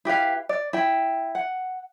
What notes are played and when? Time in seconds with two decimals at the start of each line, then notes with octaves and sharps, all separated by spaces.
0.05 E4 G4 B4 F5
0.49 D5
0.73 E4 G5
1.35 F#5